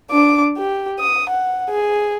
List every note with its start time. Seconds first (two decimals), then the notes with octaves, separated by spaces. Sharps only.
0.11 D4 D6
0.58 G4
0.99 D#6
1.29 F#5
1.70 G#4